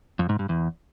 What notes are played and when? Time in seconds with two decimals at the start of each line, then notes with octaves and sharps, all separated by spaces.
0.19 F2
0.29 G#2
0.39 G2
0.49 E2